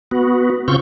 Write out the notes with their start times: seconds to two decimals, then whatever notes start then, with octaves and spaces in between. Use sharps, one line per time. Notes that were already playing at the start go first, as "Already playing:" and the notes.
0.11 B3 F#4
0.68 C#3 C4 F4 C#6 G6